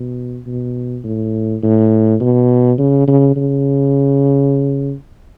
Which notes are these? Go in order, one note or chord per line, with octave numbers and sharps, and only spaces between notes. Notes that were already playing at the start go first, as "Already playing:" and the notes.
Already playing: B2
B2
A2
A2
B2
C#3
C#3
C#3